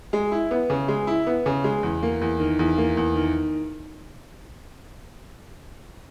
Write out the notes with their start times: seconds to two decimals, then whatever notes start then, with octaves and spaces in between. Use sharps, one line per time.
0.13 G#3
0.32 E4
0.51 B3
0.70 C#3
0.88 G#3
1.07 E4
1.27 B3
1.46 C#3
1.64 G#3
1.83 E2
2.03 A#3
2.21 E2
2.40 D#3
2.59 E2
2.78 A#3
2.97 E2
3.16 D#3